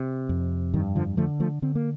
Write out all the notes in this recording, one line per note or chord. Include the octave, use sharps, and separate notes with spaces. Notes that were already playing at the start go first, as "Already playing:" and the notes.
Already playing: C3
F2
G2 D#3
D3 F3
D3 F3 A3
F3 A3
D3 C4
A#3